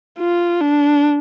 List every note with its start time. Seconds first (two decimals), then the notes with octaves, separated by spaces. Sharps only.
0.19 F4
0.61 D4